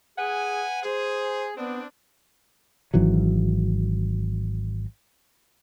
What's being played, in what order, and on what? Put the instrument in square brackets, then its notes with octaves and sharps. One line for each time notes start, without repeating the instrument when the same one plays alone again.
[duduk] G#4 [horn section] B4 F#5 G#5
[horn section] G#4 [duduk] C5
[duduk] B3 [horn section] C4 D4
[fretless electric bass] G#1 E3 F#3